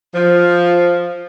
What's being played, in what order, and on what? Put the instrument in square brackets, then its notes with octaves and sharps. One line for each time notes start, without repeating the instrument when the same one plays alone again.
[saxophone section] F3